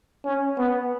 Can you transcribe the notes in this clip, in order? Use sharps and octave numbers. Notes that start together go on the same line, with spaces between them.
C#4
B3